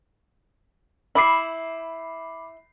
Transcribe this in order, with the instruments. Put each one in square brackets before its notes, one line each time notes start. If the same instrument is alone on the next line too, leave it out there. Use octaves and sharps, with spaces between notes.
[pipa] E4 [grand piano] B5 D6 C7